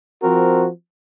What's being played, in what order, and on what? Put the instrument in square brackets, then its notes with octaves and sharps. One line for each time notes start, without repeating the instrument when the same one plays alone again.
[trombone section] F3 C4 F#4 A#4